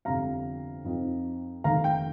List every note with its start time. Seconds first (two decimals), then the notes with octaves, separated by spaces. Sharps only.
0.05 G1 F2 C3 G3 F5 A#5
0.84 F2 F3 C4 D#4
1.64 F1 D#2 D#3 F5 A#5
1.84 G5